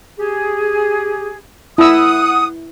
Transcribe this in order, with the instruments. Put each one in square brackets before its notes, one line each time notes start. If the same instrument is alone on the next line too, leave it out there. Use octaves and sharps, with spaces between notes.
[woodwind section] G4 G#4
[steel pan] E4 E6 [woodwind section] F#5 D#6